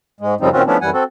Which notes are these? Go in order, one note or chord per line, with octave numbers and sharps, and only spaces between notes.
G#2 G#3
F#2 C#3 F3 G3 C4 D#4
A#2 D#3 C4 C#4 F4 F#4
F3 A3 B3 C#4 D4 E4
F#2 E3 G3 F#5 G#5
C4 F#4 A4